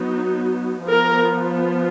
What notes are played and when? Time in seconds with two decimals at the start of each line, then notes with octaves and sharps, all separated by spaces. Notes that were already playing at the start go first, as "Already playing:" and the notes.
Already playing: F#3 B3 D#4
0.88 F3 B3 F4 A#4